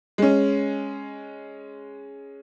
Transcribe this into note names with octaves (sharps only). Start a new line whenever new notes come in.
G#3 C#4